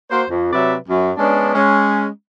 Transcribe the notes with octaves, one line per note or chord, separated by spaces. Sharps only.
A#3 F#4 C5
F2
C3 F#3 B4 D5 E5
F#2
G#3 B3 C#4 D4
G#3 C#4